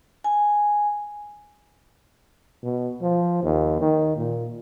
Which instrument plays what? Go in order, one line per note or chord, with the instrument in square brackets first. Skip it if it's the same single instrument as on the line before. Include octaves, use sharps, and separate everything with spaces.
[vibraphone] G#5
[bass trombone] B2
F3
D#2
D#3
A#2